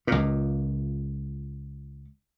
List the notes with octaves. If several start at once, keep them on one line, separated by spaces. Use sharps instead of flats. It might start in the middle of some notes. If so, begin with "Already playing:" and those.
C#2 A#2